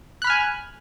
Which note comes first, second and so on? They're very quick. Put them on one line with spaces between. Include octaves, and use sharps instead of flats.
F#6 B5 F6 G#5